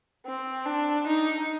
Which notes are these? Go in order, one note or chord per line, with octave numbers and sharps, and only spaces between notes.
C4
D4
D#4